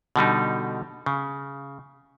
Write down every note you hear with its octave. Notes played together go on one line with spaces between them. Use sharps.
B2 D3 G3 D#4
C#3